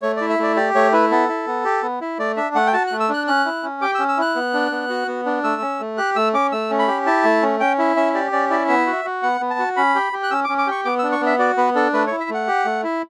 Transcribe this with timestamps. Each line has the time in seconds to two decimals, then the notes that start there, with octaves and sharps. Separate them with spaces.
0.02 A3 C#5
0.16 D5
0.21 E4
0.30 E5
0.39 A3 D5
0.56 G4 D5
0.75 A3 C#5
0.93 E4 B4
1.11 B3 A4
1.29 E4
1.47 B3
1.65 G4
1.82 B3
2.01 E4
2.19 A3 D5
2.36 D4 E5
2.55 A3 F#5
2.67 G5
2.73 F#4 A5
2.87 A3 F#6
3.00 E6
3.09 D4 F#6
3.27 C#4 F#6
3.45 E4
3.63 C#4
3.81 G4 D6
3.95 E6
3.99 C#4
4.09 E6
4.17 E4 F#6
4.36 B3
4.54 D4
4.72 B3
4.89 F#4
5.08 B3
5.26 D4
5.44 A3 E6
5.62 C#4
5.80 A3
5.98 G4 F#6
6.16 A3 E6
6.34 C#4 D6
6.52 A3 E6
6.70 C#4
6.79 B5
6.88 G4
7.06 E4 A5
7.24 A3
7.42 C#4
7.60 C#4 G5
7.78 E4
7.96 C#4 E5
8.14 G4 D5
8.32 C#4 D5
8.50 E4 D5
8.68 B3 E5
8.86 F#4
9.05 F#4
9.23 B3 F#5
9.41 B3
9.50 A5
9.59 F#4
9.77 C#4 B5
9.95 G4
10.13 G4
10.23 F#6
10.31 C#4 E6
10.44 D6
10.49 C#4
10.58 D6
10.67 G4 C#6
10.85 B3 D6
10.99 E6
11.03 D4
11.12 C#6
11.21 B3
11.26 E5
11.39 F#4 D5
11.57 B3 B4
11.75 D4 A4
11.93 A3 B4
12.07 C#5
12.11 E4
12.20 E5
12.30 A3 F#5
12.47 G4
12.65 A3
12.83 E4